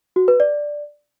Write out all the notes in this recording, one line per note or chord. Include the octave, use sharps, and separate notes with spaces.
F#4
B4
D5